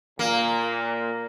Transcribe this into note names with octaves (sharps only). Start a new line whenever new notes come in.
A#2 A#3